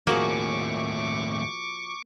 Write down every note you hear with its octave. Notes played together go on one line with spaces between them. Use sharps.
D#2 A2 F3 A#3 F#4 G#4 C#6 D6